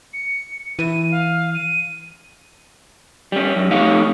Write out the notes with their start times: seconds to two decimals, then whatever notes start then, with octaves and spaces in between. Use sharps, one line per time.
0.13 C#7
0.79 E3 D#7
1.11 F5
1.54 D#7
3.32 G3 C#4
3.56 F#2
3.71 F2 A3 D#4 G4 C#5 F5